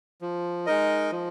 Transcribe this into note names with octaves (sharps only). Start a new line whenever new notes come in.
F3
G#3 D#4 A#4 D#5
F3